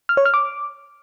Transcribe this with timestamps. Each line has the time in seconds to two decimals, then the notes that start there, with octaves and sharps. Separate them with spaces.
0.09 F6
0.17 C#5
0.25 F6
0.34 D6